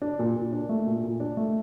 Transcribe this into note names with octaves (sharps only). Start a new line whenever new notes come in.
D4
A#2
A#2
D4
A3
A#2
A#2
D4
A3